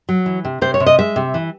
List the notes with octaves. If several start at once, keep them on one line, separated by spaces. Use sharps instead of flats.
F#3
E3
C3
C3 C5
C#5
C3
D#5
G#3 E5
C3
E3